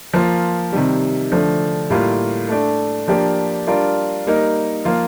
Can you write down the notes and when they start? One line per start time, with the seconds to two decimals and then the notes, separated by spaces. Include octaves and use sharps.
0.14 F3 A#3 F4
0.72 C3 D#3 G3
1.31 D3 F3 A3 D4
1.90 A2 G3 A#3 F4
2.49 A3 D4 A4
3.08 F3 A#3 D4 G4
3.67 G3 D4 F4 A#4
4.26 G3 A#3 D#4 A#4
4.85 F3 A#3 F4